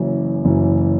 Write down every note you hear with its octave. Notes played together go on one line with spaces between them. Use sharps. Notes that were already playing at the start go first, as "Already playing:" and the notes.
Already playing: F#1 F#2 E3
F#1 F#2 E3